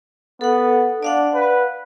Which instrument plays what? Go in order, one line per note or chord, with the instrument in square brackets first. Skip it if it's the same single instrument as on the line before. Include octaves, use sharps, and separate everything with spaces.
[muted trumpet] B3 [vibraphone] A4 F#5
[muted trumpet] D4 [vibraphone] D5 F5 F#5
[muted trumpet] B4